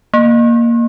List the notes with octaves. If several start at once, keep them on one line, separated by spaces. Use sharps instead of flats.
A#3